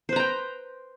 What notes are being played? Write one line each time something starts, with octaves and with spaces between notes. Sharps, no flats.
B4 C5 G5 A#5